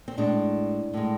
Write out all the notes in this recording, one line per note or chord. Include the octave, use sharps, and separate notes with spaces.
C4
A2 G#3 D4
A2 G#3